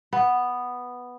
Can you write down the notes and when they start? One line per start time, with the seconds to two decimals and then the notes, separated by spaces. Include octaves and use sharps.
0.13 B3